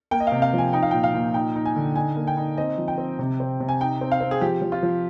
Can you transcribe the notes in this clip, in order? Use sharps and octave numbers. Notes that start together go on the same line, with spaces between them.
A#3 G5
D#5
C3 F5
F5
F3 G#5
D#4 G5
F5
A#2 G5
F5
A#2
D#4 G5
D#4
G#5
D3
D#4 G#5
A#3
G5
D#4
C4 D#5
F3
G5
C4
C3
C4
C3
G#5
D#4 G5
C4
F5
C4
G#4
F3 G4
F3
F4
F3